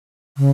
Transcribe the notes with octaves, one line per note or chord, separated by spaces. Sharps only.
C#3